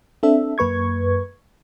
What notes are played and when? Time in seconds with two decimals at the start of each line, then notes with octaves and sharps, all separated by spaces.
0.23 C4 D4 A4 E5
0.58 F#2 A#3 B4 C#6 G#6